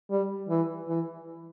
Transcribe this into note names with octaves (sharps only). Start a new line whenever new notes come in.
G3
E3
E3